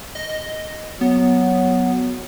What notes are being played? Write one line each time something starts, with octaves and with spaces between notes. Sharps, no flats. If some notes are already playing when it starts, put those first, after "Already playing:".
D#5
F#3 B3